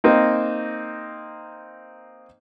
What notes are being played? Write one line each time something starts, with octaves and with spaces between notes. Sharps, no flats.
A#3 C4 D#4